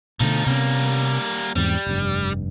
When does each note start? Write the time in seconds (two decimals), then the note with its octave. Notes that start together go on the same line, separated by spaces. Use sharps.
0.20 B2 D3 F3 A3 D#4
0.46 C3 G3 A#3 B3 C#4
1.56 E2 G#2 G3 C4
1.87 F1 G2